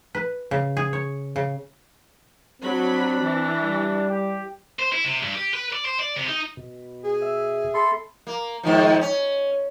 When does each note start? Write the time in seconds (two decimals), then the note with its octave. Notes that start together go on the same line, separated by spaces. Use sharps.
0.15 B4
0.51 C#3
0.77 G#4
0.93 C#5
1.36 C#3
2.62 F#3 C4 D4 B5
3.21 E3
3.61 G3
4.09 G4
4.79 C5
4.92 E4
5.04 C3
5.23 G2
5.35 G4
5.54 B4
5.73 D5
5.85 C5
5.99 D5
6.16 C3
6.28 D#4
6.57 B2
7.04 G#4
7.21 E5
7.74 A4 B5 C6
8.27 A#3
8.63 G#2 D#3 F3
9.01 C#4